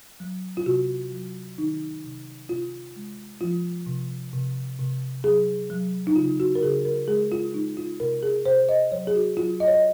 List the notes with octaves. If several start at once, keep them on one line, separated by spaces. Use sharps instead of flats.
F#3
F4
C3 F#4
F#3
D#3 D#4
C3
C3 F4
G#3
F3 F4
C3
C3
C3
F#3 G#4
F#3
D#4
C#3 F4
F#4
A#4
C#3 G#4
A#4
G#3 G#4
F4
G#3 D#4
F4
C3 A#4
G#4
C3 C5
D#5
F#3 C#5
G#4
F#4
F#3 F4
D#5
C#5
D#5